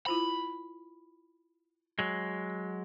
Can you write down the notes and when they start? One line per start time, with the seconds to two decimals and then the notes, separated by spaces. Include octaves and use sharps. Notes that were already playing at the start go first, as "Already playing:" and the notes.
0.06 E4 F4 C5 B5
1.99 F#3 G#3